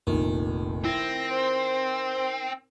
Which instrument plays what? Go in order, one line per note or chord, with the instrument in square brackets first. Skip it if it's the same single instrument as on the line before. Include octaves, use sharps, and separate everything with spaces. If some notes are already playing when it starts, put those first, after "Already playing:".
[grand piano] F1 A#1 [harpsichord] D#3
[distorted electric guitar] C4 [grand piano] E4 [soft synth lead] A#6
[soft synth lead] C5